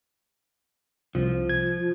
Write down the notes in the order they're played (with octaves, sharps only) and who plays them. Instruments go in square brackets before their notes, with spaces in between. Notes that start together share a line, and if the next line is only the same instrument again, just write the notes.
[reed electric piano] C2 [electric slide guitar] F3
[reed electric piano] G#6